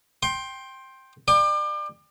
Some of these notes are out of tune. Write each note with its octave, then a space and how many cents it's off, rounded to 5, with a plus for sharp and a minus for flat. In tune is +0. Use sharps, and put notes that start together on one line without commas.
G5 +0 C6 +20
D5 +35 G5 +25